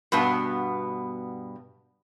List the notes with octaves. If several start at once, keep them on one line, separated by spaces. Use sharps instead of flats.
G2 B2 B3